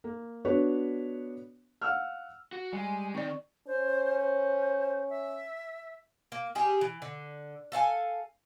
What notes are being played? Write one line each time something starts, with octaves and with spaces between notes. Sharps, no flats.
A#3
B3 D4 F#4 B4 C#5
F5 F#5 E6 F6
F#4
G3 G#3 G#5
D#3 C4 D5 C#6
C#4 C5
C5
E5
A#3
G3 G4 G#4
E3
D3
A4 F5 F#5 G#5